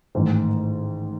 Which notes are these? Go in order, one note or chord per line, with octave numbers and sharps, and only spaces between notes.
A1 G#2 D#3